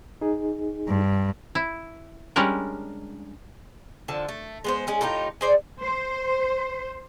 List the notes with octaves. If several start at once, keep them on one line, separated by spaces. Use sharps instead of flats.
D#4 G#4
G2
E4
G3 G#3 C#4 D4 A#4
D3 F3 A5
A3
G#3 B3 C5
G#3 C#4 G#4
A2 D#4 F4 G4
G#4 C5 D5
C5